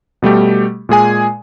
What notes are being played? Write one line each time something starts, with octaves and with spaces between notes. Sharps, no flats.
B2 G3 A3 G4
A#2 G#3 G#4 G#5